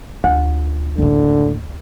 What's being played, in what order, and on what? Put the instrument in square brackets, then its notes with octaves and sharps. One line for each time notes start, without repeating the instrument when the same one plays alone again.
[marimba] D2 [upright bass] F4
[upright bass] F#1 A2 [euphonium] D3